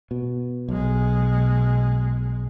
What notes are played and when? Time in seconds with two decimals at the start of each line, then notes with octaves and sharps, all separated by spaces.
0.11 B2
0.69 B1 B2 G#3